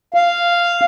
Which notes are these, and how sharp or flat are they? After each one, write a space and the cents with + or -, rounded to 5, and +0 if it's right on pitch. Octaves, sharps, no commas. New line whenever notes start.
F5 -5